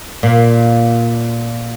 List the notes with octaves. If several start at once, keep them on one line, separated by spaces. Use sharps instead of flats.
A#2